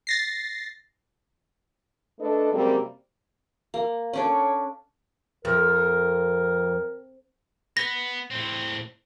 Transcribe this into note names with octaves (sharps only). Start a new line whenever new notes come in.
A6 A#6 C7
A3 D4 A4 B4 D#5
F#2 C3 G3 G#3 A#3 C4
A#3
C#4 D4 A4 C#5
F2 A#4
B3 A#6
A2 C4